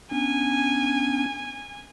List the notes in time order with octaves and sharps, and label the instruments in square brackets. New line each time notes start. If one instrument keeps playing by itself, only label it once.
[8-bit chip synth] B3 C#4 D4 [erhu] G#5